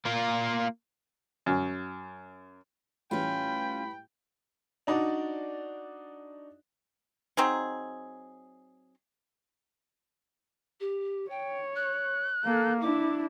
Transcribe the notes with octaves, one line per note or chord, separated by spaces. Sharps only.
A#3 F4
F#2
A2 E3 G3 C#4 F4 G5 B5
D4 D#4 F#4 D5
F#3 C4 D#4 G#4
G4
C#5 G5
F#6
A#3 A4
D4 E4 D6